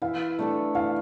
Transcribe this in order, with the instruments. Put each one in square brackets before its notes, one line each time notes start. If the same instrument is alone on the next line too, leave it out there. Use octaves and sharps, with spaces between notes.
[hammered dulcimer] E3 [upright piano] F5
[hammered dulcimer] A3 D4 A4
[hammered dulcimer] E3 [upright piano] F5